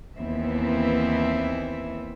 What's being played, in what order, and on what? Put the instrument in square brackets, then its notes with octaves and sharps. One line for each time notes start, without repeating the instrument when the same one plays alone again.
[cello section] D#2 E3 B3 C4 E5